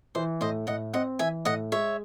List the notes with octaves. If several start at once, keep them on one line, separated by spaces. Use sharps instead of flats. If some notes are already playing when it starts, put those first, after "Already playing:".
E3 C5
A2 C5 D#5
A2 D#5 F#5
C4 D#5 F#5
E3 E5 G#5
A2 D#5 F#5
G#3 C#5 E5